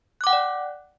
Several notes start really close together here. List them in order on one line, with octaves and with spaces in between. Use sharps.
F#6 D6 F#5 G5 D5